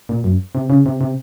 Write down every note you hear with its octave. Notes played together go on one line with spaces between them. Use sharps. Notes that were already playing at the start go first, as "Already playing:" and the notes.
A#2
F#2
C3
C#3
C3
C3